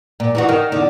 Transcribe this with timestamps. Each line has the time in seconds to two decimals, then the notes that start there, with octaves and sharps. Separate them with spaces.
0.20 A#2
0.35 E3 D#4 F#4
0.49 D#3
0.72 E2 D3